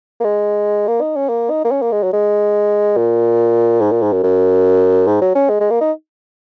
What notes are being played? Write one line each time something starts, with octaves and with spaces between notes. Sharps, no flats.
A#3
G#3
A#3
D#4
C#4
A#3
D#4
A#3
C#4
A#3
G#3
F#3
G#3
A#2
G#2
A#2
G#2
F#2
F#2
G#2
F#3
C#4
G#3
G#3
A#3
D#4